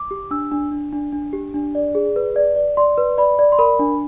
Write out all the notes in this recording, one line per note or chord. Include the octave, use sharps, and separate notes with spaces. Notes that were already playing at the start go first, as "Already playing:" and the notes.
Already playing: D6
G4
D4 E6
D4
D4
D4
D4
G4
D4
D5
G#4
B4
D5
D5
D5 C6
B4
D5 B5
D5
C6
A#4 B5
D4